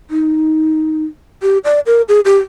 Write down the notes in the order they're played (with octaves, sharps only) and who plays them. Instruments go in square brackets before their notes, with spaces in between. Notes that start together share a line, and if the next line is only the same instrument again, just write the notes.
[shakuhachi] D#4
G4
D5
A#4
G#4
G4